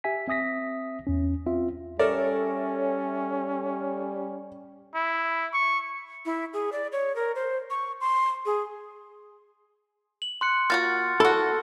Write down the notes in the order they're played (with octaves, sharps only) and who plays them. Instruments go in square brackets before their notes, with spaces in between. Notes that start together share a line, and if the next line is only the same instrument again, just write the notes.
[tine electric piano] G4 E5 G#5 B6
C4 E5 D#6 A#6 B6
E2 C#4
C4 F4 E5
[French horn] G3 [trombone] C#4 [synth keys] A4 C#5 E5 [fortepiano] A#4 D5
[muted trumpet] E4
C#6
[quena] E4
G#4
D5
C#5
A#4
C5
C#6
C6
G#4
[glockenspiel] F#7
C6 F#6 C#7
[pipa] A#3 F4 F#4 [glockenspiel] F6 A6
[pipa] E4 F#4 [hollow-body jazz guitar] A4